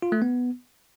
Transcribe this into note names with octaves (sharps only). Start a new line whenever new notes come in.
F4
A3
B3